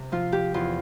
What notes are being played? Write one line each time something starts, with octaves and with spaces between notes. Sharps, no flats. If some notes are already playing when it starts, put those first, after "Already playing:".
Already playing: C3 C4
F3 F4
G4
E2 F4